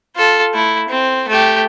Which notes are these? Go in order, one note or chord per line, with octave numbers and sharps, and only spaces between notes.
F4 A4
A3 E4
C4
A3 G4